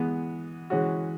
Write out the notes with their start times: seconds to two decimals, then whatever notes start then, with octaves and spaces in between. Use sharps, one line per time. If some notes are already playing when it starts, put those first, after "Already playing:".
Already playing: E3 G#3 B3
0.70 E3 G#3 C#4 F#4